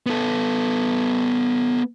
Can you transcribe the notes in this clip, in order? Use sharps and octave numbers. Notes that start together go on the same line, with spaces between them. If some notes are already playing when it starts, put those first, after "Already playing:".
B3 A4